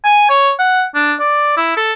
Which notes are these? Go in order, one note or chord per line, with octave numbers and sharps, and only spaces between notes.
G#5
C#5
F#5
D4
D5
E4
A4